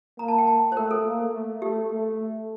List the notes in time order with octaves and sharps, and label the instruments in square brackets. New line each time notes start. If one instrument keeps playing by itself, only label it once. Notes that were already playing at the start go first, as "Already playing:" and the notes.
[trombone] A#3 [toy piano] A#5
[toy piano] A5
G5
A5
C5
[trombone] A3 [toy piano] A#4
[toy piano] A4
[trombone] A#3
A3
[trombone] A3 [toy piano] G4
[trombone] A3